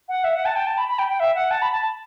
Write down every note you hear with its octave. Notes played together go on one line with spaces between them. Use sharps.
F#5
E5
F#5
A5
G5
A5
B5
B5
G5
G5
E5
F#5
A5
B5
A5